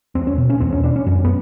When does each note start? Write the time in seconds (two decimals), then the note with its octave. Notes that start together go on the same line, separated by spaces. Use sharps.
0.15 E2 C4
0.27 C#4
0.38 B2
0.50 C#4
0.60 E2 C4
0.73 C#4
0.83 B2 D4
0.96 C#4
1.06 F#2 C#4
1.25 B3